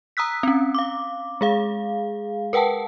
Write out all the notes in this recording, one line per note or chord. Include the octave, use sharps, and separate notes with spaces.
A#5 D#6 E6 F#6 B6
C4 C#4
F5 D6
G#3 G#4 F5
A#4 B4 F#5 G5 A5